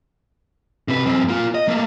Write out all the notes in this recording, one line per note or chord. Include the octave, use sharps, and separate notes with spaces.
C3 B4
F#2 C4
A#3 F4
D#5
A3 A#3